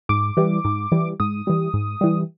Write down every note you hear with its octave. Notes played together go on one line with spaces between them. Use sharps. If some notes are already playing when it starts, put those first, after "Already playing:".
G#2 D6
E3 G3
G#2
E3 G3
G#2 D#6
E3 G3
G#2
E3 G3